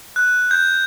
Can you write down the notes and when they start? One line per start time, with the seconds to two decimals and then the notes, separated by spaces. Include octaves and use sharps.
0.16 F#6
0.51 G6